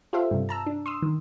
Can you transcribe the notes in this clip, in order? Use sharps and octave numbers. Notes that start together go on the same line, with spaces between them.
F4 G4 A4 C5 E5 F5
G2 C3
A5 A#5 E6
D4
C6 D#6 E6
D#3